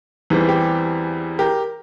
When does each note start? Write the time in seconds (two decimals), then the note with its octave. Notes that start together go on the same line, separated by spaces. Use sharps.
0.30 E2 E3 G3 C4
0.49 G4
1.39 G4 A#4